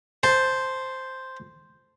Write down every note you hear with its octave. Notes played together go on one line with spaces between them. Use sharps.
C5 A5